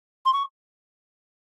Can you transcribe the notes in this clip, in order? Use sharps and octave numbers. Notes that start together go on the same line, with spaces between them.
C6
C#6